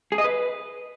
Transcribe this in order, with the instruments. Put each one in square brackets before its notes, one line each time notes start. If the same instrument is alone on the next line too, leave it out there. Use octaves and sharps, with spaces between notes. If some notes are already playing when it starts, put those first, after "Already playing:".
[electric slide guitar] G#4
D#5
B4